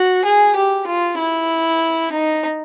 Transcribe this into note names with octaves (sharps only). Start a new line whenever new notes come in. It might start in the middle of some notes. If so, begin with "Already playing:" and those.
Already playing: F#4
G#4
G4
F4
E4
D#4